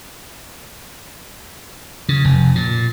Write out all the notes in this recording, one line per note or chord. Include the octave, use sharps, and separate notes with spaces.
C#3
F1
A#2